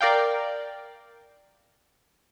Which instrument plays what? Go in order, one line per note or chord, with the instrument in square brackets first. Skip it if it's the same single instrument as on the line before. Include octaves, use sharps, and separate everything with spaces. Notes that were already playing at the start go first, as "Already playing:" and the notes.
[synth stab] A#4 D5 F5 G5